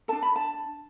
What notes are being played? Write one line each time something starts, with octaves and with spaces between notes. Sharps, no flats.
D4 A4 A5
B5
A5